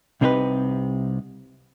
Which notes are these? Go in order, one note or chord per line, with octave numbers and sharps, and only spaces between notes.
C2 C3 C4 D#4 G#4 B4